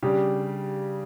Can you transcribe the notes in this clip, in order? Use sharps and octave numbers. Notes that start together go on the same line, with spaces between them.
C#3 G3 D4 G4